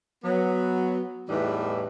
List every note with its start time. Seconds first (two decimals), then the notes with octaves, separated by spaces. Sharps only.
0.24 F#3 B3
1.29 E2 A2 E3 G3 D#4 B4